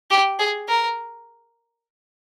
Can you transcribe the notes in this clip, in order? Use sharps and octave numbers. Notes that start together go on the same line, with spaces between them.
G4
G#4
A#4